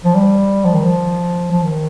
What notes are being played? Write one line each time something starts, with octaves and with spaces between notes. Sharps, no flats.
F3
G3
F3
D#3
F3
F3
D#3